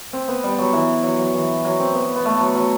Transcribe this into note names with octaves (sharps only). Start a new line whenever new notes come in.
C4
B3
G3
F#3
E3
F#3
F#3
E3
F#3
C4
B3
B3
A3
F#3
F#3